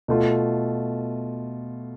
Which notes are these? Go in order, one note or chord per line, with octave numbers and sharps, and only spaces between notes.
B2 A3 F4